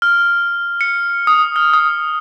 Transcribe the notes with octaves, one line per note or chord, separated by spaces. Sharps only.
F6
C#7
D#6
F6
D#6